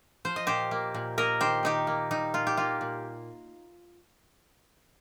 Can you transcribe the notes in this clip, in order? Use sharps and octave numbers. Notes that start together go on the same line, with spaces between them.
F3 C5
D#5
A#2 G4 C5
A#3
A#2
A#3 A#4 D#5
D#3 G4 C5
D#3 D#4 G4
A#3
G3 D#4
A#2 F4
G4
A#3 F4
A#2